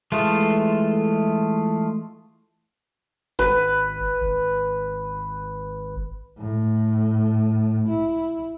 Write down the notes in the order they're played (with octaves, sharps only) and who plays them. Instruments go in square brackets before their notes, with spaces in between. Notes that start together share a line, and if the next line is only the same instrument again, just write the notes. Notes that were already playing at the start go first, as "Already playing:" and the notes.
[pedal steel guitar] E3 G#3 A3 F4
[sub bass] G#1 [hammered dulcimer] B4
[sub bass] G#1
[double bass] A2
E4